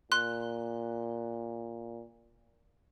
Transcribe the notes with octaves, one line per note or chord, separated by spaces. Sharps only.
A#2 C6 F#6